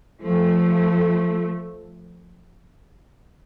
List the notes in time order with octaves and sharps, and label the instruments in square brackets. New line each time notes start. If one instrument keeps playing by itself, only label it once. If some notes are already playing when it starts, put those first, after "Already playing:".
[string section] F3 A3